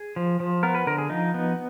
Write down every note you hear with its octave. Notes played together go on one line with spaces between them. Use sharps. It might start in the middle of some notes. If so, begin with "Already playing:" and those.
Already playing: G#4
F3
F3
B3 A#4
B4
D3 A#4
G#4
F3 D#4
B3